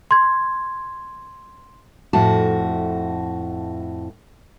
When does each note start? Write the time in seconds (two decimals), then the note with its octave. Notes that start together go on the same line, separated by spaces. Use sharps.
0.11 C6 G#6
2.13 F2 A2 F#4 A5